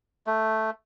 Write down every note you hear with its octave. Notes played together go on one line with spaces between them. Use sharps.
A3